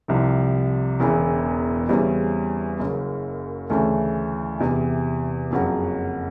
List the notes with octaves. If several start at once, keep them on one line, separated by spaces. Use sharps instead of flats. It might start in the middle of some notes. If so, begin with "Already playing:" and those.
C2 C3 F3
E1 E2 C#3 E3
E2 C#3 E3 G3 C4
F#1 F#2 C#3
D2 C#3 E3 A3
E2 C3 E3
F#1 F2 C#3 F#3